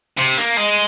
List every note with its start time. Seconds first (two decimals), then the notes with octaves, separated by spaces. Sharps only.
0.19 C3
0.38 A#3
0.57 G#3